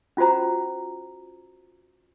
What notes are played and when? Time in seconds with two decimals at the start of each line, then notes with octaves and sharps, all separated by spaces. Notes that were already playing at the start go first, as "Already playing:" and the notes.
0.17 C#4 F4 F#4 C5 A#5